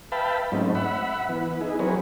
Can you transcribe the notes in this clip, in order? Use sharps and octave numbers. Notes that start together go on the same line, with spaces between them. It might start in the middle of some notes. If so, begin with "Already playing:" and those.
B4 E5 F5 G5 A5 B5
G#2 F#3 A3 C4 C#4 D#4
E5 F#5 B5
E3 B3
D#4 E4 G#4
F#3 C4 G#4 A#4 B4 C#5